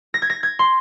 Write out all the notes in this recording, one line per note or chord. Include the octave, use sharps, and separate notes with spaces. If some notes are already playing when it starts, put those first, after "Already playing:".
A#6
G#6
A#6
G#6
C6